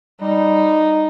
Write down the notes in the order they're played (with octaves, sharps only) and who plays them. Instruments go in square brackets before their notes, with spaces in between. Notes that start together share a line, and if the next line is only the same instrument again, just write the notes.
[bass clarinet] G3 [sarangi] D#4